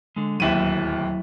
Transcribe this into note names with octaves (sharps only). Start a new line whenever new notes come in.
D3 G#3
D1 D#2 F#3 E4 E5 D#7